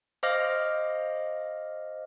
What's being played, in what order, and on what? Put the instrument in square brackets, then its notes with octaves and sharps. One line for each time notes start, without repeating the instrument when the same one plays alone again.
[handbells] C5 D#5 F5 D6 F6 A#6